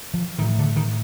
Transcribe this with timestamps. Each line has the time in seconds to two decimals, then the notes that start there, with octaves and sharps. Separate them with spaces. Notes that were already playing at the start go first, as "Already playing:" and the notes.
0.14 F3
0.38 A2 D#3
0.59 D3
0.76 D#3